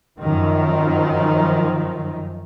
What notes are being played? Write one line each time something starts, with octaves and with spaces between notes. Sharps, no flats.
F#2 D#3 F3